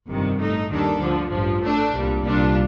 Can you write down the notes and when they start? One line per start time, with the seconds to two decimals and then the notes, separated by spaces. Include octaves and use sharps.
0.08 G1 F2 C3 D#3
0.39 A2 A3 D#4
0.70 D#2 D#3 G3 D4 A4
1.00 D2 D3 F3
1.31 A1 G2 F3
1.62 A2 A3 D4
1.92 C2 A#2 G3
2.23 C2 A#2 G3 D4 F4